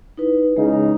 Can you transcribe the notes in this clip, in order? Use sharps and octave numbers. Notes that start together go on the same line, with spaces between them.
D#4 E4 B4
C#3 G#3 D#4